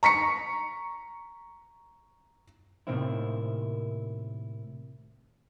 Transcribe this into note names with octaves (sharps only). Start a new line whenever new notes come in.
A#5 C#6 B6 C#7
A2 C3 D#3 A#3 C4 E4